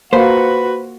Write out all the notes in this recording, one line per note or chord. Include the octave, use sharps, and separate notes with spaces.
A#3 F#4 B4 C5